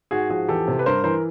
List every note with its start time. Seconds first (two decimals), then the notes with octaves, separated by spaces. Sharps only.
0.11 G#2 F#4 G#4
0.29 F3 F#4 G#4
0.49 E2 G4 A4
0.68 C3
0.79 B4
0.86 G2 A#4 C5
1.04 E3 A#4 C5